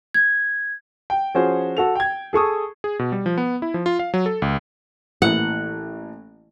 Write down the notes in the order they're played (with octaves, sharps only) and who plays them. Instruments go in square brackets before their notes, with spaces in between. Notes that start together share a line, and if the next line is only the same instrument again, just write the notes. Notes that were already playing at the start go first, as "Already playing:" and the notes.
[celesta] G#6
[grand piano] G5
F3 C#4 F#4 G#4 C5
F#4 A4 F7
G5 G#6
G#4 A4 C#6 D#6
[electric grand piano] G#4
B2
G3
F3
B3
E4
F3
F4
F5
F#3
A4
C#2
[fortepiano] A1 E3 A#3 [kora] F#5